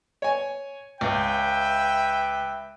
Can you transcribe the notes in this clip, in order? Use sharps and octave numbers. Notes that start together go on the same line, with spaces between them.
C#5 G#5
C#2 B4 E5 G5